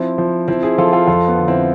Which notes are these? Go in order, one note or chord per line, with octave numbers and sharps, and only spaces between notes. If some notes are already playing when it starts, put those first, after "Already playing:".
Already playing: F3 C4 E4
F3
F3 C4 E4
E4 G#4
F3 F4 A4
F4 A4
F2 F4 A4
B3
D3
C4 E4